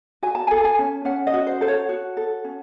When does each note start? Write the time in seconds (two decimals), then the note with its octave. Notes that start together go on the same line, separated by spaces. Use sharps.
0.23 F#4 G#5
0.35 A5
0.47 A4 G#5
0.64 G#5
0.79 C#4
1.05 C#4 F#5
1.27 D#5
1.33 F#4
1.47 C5
1.61 A4 C5
1.68 C#5
1.89 F#4
2.17 A4
2.44 C#4